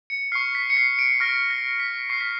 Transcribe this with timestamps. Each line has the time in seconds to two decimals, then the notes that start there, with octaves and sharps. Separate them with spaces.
0.10 C#7
0.32 C#6 F6 C7
0.55 B6
0.70 C#7
0.77 C7
0.99 D7
1.20 C#6 F6 A#6
1.50 A#6
1.80 B6
2.10 C#6 F6 C7
2.21 B6